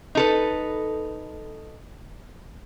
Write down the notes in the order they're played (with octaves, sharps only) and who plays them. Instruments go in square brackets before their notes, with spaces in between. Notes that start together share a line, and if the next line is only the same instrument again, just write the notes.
[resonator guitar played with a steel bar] D#4 A4 B4